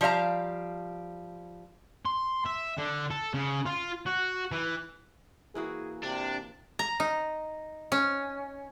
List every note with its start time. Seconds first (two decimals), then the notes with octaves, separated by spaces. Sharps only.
0.01 F3 G3 D5 F5 A#5
2.06 C6
2.45 E5
2.77 D3
3.11 A4
3.34 C#3
3.66 F4
4.07 F#4
4.52 E3
5.55 E3 A#3 F#4 G#4
6.03 C3 D4
6.79 A#5
7.00 D#4
7.92 C#4